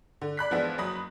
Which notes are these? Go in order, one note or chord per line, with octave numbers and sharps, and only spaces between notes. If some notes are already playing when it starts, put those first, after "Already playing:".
D3
D5 B5 F#6 B6
E3 F3 G#3 B3 D4 E4
F#1 F#3 B5 D#6